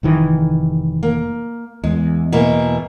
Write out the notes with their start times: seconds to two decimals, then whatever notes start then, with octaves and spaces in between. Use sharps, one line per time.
0.03 F1 D#3 E3
1.03 A#3
1.84 E2 G#3
2.32 B2 E3 A#3